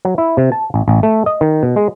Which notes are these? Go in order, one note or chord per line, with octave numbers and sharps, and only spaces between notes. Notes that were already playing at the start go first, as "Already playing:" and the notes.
F#3
E4
C3
A5
A1
A1
A3
D#5
D#3
B2
G#3